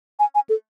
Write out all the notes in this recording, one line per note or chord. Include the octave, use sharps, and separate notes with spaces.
G#5
G#5
A4